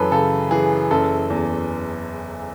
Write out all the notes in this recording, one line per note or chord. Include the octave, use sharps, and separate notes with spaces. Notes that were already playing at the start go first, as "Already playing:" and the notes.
Already playing: F#2 E3 A4 B4
C#3 A4
E3 G#4
F#1 A4
E2